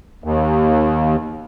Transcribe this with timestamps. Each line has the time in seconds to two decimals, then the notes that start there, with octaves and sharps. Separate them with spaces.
0.24 D#2